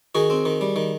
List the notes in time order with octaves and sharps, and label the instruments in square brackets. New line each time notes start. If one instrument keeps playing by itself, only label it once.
[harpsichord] D#3 F#4 G#4
C4
D#3
G3
D#3